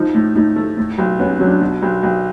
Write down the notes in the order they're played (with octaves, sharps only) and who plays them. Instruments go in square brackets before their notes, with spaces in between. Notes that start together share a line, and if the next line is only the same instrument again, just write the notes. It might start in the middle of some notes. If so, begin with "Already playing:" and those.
Already playing: [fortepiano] F3 [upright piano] D#4
[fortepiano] A2
[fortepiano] A2 [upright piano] D#4
[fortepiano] A3
A2
B1
[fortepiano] B3 [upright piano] C#4
[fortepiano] F#3 [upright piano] C#4
[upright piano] D4
[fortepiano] B2
B1
B1